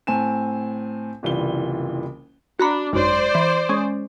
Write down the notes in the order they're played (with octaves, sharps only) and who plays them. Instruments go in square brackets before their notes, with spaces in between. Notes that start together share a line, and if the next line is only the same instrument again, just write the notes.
[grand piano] A2 C4 G#5 A5 E7
F#1 C2 E3 G3 F4 G7
[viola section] D4 [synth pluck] F#4 A#5 B5
[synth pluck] G#1 F#2 C6 [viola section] C5 D5
[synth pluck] E3
G#3 C#4